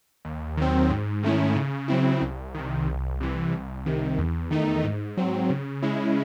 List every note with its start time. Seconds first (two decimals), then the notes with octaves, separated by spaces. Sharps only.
0.25 D#2
0.57 D#3 F#3 C4
0.90 G#2
1.23 D#3 A3 C#4 E4
1.56 C#3
1.88 F#3 C4 E4
2.21 C2
2.55 C3 D#3
2.87 C2
3.21 C3 E3
3.52 C2
3.86 C3 D#3
4.18 E2
4.51 D#3 A3 D#4
4.85 G#2
5.17 F#3 C4
5.50 C#3
5.83 G#3 C#4 E4